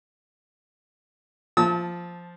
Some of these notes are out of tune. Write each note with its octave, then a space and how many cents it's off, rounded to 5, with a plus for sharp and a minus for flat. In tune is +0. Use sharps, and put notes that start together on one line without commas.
F3 +0 A5 +0 E6 -45